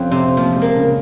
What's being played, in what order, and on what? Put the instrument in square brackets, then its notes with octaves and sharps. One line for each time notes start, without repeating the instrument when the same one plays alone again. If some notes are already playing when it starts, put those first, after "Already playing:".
Already playing: [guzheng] F2 [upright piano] C4 C#4
[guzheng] C3 [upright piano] C4
[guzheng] F3 [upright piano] A#3
[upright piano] G#3
[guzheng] A#3
[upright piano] C#3